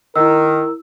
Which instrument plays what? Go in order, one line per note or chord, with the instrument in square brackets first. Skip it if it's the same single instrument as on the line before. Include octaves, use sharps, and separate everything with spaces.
[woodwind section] D#3 [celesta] E4 E6 [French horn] A#4